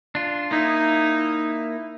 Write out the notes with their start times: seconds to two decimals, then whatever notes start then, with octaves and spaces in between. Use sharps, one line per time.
0.15 D4 F4
0.51 A#3 D#4 E4